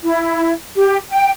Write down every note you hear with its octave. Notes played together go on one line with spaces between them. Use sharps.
E4
G4
G5